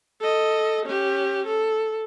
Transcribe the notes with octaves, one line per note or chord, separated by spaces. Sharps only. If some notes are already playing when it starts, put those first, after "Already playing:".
A4 D#5
C#4 G4
A4